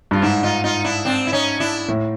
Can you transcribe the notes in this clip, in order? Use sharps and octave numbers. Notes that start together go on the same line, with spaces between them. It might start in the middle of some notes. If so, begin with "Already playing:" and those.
G2 F4
G#2 D4 E4
D#4 F4
D#4 F4
D4 E4
C4 D4
E4
C#4 D#4
D4 E4
A2